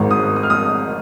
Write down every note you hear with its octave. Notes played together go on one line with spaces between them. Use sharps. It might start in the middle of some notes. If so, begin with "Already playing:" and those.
Already playing: G#1 G#2 D#3
D#6
D#6
F6
D#6